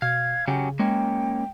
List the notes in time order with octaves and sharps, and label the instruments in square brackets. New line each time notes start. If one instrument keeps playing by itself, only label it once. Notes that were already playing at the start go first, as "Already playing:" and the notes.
[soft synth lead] B2 [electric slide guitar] F5 [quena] G#6
[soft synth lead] C#3 [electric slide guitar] F#3 C#4 G4 [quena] G#5
[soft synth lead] G#3 [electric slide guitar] A#3 C#4 [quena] G5